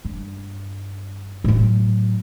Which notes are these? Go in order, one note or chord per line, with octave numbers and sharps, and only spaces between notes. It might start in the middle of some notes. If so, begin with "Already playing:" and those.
G2
A2 F#3